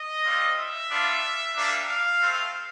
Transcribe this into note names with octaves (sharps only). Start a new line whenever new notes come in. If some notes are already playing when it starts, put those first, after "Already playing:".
Already playing: D#5
G3 C4 F4
E5
G3 B3 D4 F4
G3 A#3 D4
F5
A3 C4 F4